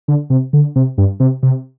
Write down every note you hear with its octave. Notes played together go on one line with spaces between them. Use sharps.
D3
C3
D3
C3
G2
C3
C3